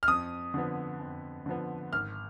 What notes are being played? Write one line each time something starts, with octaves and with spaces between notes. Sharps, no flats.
F6
F2 D#6
D3 F3 B3
F2
D3 F3 B3
G#1 F6